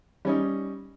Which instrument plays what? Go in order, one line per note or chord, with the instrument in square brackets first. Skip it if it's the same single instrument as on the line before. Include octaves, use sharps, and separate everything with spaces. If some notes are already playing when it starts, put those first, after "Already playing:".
[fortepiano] G3 C#4 D#4